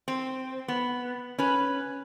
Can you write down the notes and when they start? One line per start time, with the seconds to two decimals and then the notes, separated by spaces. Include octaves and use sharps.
0.08 C4
0.68 B3
1.38 C#4 B4